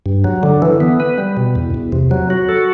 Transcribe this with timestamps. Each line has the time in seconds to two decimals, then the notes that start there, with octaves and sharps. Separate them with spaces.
0.06 G2
0.24 F#3
0.43 D3
0.62 E3
0.80 B3
1.00 B4
1.18 G3
1.37 B2
1.55 E2
1.74 E2
1.92 C3
2.11 F#3
2.30 F#4
2.49 A4